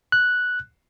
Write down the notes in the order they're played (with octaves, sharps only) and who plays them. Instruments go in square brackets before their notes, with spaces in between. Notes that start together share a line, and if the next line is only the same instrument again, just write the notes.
[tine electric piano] F#6